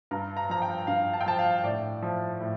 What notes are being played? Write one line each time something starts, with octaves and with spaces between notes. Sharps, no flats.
G2 A#5
A#5
F3 A#5
G5
G2 F5
A5
G5
F3 A5
F5
A2 D5
F3
A2